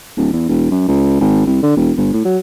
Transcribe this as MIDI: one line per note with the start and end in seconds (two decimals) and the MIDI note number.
0.17 0.28 26
0.33 0.46 40
0.49 0.66 28
0.71 0.84 42
0.88 1.18 37
1.21 1.46 32
1.46 1.62 36
1.63 1.76 50
1.77 1.92 28
1.97 2.12 31
2.13 2.22 45
2.25 2.38 54